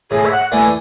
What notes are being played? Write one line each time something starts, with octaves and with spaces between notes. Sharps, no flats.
A2 G#4
E5
F#5
E3 A3 D4 G#5